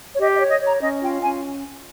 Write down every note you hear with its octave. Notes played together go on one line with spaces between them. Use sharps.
C#5
G4 D#5
D#5
C#5
D#5
C#5
A#5
C#4 D#5
F4 G5
C#4 G#5